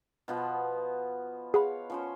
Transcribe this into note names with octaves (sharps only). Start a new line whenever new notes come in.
B2 F3 B3
G#4 C#5 F5 F#5 B5
F3 C#4 C5